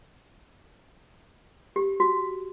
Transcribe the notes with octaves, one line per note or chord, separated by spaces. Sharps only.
G4
F#4